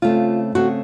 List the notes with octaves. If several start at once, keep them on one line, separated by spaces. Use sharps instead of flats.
C#3 A3 C4 F4
C#3 A3 C4 F#4